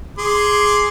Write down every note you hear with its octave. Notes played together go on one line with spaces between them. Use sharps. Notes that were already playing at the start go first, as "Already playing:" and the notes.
G#4 C6 D6